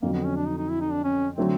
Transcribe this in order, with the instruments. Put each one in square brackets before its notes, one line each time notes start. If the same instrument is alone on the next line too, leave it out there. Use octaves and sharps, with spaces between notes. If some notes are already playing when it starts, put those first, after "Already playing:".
[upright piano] F2 D3 F#3 [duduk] A#3
[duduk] B3
C#4
D4
D#4
D#4
E4
D#4
D4
C#4
[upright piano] D3 F#3 A3 [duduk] C4